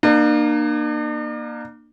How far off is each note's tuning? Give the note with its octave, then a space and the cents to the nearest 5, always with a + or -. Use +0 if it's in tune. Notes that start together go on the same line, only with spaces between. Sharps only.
A#3 +15 D4 +45